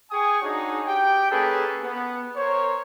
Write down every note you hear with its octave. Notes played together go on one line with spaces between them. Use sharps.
G#4 G5 G#5 C#6 D#6
D4 D#4 F#4 G#4 C#5
G4 G5
A#3 C#4 G#4 A4 B4
B3
A#4 C5 C#5